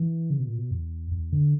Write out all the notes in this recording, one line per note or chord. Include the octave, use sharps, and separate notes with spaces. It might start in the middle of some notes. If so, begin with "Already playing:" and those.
Already playing: E3
C#3
B2
A#2
B2
E2
E2
D3